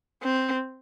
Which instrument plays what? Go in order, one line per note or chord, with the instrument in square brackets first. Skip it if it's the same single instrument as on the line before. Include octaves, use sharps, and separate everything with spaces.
[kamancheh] C4